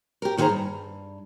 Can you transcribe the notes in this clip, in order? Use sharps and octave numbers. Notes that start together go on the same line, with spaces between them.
G4 A#4
D#2 D#3 E4 G#4 C5 A#5
G2